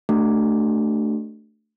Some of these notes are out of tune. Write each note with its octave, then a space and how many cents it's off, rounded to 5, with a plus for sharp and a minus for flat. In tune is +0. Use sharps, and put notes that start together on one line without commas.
A3 +0 D4 +0 F#4 +35